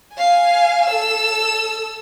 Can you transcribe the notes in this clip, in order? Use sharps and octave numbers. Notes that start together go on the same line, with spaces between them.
F5 G#5
A4 E6